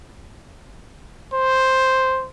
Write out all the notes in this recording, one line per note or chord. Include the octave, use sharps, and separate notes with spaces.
C5